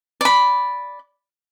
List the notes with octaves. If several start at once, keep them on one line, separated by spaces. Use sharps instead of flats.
D5 B5